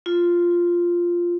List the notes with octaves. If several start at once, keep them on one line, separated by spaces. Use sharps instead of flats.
F4